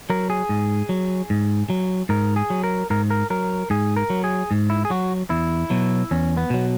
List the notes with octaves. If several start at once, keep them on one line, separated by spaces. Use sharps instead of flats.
F#3 A#4
G#4
G#2
F#3
G#2
F#3
G#2 A#4
G#4
F#3
A#4
G#2 A#4
A#4
F#3 A#4
G#2 G#4
A#4
F#3
G#4
G#2
E4
G#4
F#3 F#4
E2 E4
B2 F#3
E2 C#4
B3
B2 F#3